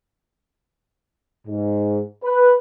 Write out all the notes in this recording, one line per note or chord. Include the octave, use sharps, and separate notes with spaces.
G#2
B4